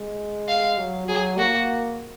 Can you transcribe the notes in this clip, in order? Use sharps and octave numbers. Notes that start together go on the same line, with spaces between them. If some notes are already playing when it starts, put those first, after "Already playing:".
Already playing: G#3
F5
F#3
F#3 G#4
A#3 F#4